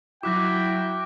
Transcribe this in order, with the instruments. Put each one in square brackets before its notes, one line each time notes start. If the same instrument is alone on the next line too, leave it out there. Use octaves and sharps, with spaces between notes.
[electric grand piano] F#3 F#4 [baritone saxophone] E4 [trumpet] G5 [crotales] D6 F#6 A#6